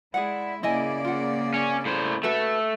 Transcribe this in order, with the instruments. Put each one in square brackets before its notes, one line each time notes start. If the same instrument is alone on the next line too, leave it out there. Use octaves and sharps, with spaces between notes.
[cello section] G#3 E4 [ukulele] G#4 D5 F#5
[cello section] C#3 A#3 D5 [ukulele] E4 D#5 G#5
[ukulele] F4 F#5
[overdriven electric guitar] C#4
A2 C5
[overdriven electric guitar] A3 [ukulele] F#4 A4 B4